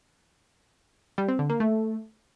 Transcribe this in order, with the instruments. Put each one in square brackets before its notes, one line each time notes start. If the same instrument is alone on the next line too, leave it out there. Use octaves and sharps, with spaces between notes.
[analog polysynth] G3
C4
D3
A#3
A3